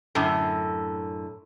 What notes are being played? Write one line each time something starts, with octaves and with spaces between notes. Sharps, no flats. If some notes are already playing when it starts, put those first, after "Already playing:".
F#2 A2 D3